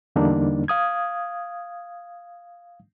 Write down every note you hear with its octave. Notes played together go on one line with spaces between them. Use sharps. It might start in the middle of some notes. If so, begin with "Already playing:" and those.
E2 D3 G3 A#3 D4 D#4
F5 D#6 G#6